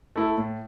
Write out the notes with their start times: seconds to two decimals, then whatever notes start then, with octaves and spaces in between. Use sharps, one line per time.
0.16 A3 E4 A4
0.38 A2